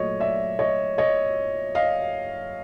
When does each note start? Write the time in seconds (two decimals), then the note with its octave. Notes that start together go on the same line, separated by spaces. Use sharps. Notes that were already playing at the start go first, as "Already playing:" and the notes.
Already playing: A#2 F#3 A3 C#5 D#5
0.20 D5 E5
0.59 C#5 D#5
0.98 C#5 D#5
1.75 D#5 F5